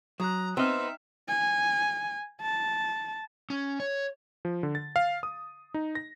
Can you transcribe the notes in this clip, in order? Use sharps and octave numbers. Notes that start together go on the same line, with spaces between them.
F#3 A#5 D#6 F#6
B3 C4 D#4 D#5 E5 E6 F6
G#5
A5
C#4
C#5
F3
D3
A6
F5
D#6
D#4
A#6